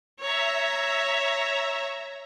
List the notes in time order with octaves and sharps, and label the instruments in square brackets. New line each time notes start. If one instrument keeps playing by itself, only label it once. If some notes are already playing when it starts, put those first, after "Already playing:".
[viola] C#5 [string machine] E5 A#5